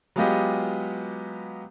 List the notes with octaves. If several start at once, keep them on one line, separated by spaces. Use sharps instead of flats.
F#3 G#3 B3 F4 G4 D#5